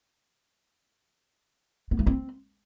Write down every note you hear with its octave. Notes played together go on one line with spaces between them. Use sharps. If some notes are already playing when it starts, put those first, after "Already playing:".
B3
A3
C4